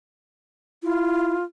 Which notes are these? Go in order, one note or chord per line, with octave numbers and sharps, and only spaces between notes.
E4 F4